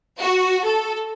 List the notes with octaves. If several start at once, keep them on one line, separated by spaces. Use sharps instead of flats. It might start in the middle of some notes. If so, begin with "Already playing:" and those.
F#4
A4